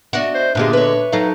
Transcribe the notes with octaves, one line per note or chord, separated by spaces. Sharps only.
D4 F#4 D#5 E5
C5
A#2 D3 G#3 B3 D4 F4 G4
B4 C#5
F#3 D#4 A4 F5